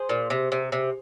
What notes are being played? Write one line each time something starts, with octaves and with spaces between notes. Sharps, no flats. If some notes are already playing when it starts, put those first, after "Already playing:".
Already playing: G#4 C5
A#2
C3
C3
C3